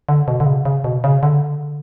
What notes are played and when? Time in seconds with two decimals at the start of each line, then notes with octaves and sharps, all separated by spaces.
0.09 D3
0.28 B2
0.40 D3
0.46 C#3
0.65 C#3
0.84 B2
1.04 C#3
1.23 D3